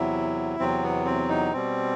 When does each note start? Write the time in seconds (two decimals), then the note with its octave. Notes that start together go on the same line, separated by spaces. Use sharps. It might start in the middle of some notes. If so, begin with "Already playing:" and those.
Already playing: E2 C3 F#3 E4
0.59 E2 C3 F#3 C4
0.83 B3
1.05 C4
1.29 D#4
1.52 B2 G3 C4